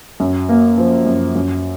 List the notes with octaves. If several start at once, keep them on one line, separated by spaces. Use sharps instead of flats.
F#2
A#3
F3
F#2
F#2